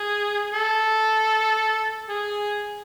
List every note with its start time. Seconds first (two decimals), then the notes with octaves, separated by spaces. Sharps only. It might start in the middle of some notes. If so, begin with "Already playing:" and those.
Already playing: G#4
0.53 A4
2.09 G#4